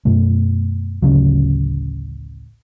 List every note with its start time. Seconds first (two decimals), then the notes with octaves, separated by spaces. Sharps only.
0.05 F#2 B2 A3
1.02 A1 D2 C#3 F#3